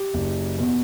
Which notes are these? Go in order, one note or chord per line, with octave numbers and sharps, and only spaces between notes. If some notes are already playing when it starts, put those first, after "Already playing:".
Already playing: G4
F#1
E2 B2